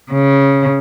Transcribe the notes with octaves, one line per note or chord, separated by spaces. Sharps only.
C#3